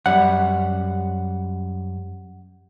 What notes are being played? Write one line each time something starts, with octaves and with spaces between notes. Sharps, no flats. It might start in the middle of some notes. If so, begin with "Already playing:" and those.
F#2 G3 F#5